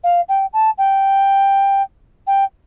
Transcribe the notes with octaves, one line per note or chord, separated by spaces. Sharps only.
F5
G5
A5
G5
G5